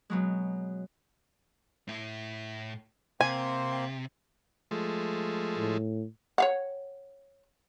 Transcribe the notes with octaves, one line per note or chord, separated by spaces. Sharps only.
B2 F#3 G#3
A2 E4
C3 A#3 C4 G#5 C6
F3 G#3 A3
A2
C#5 F5 F#5